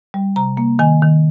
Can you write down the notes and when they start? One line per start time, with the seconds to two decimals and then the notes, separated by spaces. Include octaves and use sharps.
0.14 G3
0.36 C3 A#5
0.57 A#3
0.79 D#3 G#5
1.02 D#3